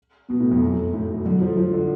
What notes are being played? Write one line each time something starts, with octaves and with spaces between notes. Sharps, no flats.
B2 B3
A2
F2
F#2
A2 A3
B2
D3 F#3
F3
F3
D3